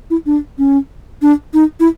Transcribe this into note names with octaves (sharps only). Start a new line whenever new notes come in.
E4
D4
C#4
D4
D#4
E4